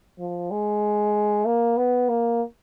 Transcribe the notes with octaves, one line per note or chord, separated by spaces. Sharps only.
F3
G#3
A#3
B3
A#3